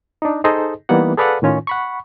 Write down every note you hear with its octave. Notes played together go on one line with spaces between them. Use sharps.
D4 D#4
D#4 G#4 A4 C5 D#5
E3 G3 A#3 B3 D#4 F#5
G#4 A4 B4 D5 F5 F#5
A2 D#3 C#4 F4
F#5 B5 C#6